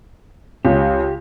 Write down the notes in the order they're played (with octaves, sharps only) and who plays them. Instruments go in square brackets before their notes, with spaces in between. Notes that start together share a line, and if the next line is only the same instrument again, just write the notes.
[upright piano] C#2 C#3 [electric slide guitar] G4